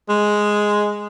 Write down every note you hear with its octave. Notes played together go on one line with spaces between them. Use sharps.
G#3